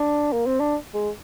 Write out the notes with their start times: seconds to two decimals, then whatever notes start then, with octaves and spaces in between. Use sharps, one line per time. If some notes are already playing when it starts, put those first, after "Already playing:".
Already playing: D4
0.32 A#3
0.46 C4
0.60 D4
0.94 G#3